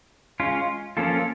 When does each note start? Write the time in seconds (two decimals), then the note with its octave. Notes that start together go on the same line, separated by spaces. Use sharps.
0.40 G#3 C#4 F4
0.97 F3 A#3 C#4 F4 A4